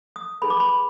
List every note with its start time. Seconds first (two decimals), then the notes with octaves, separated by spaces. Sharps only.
0.16 D#6
0.42 D#4 G#4 B4 B5
0.50 D6
0.60 B5